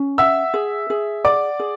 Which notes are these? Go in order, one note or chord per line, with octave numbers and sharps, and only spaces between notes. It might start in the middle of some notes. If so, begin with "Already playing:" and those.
Already playing: C#4
E5 F#5 E6
G#4
G#4
D5 F#5 D6
G#4